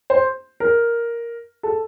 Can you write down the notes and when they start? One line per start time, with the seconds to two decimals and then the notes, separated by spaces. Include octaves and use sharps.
0.10 C5
0.60 A#4
1.63 A4